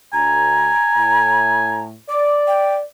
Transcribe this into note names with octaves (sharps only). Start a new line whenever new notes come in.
D2 G#5 A#5
A2
D5 D6
G5